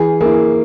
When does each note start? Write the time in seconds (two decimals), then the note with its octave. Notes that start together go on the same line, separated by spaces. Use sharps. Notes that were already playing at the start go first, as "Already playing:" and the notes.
Already playing: E3 G#4
0.21 A#3 E4 G#4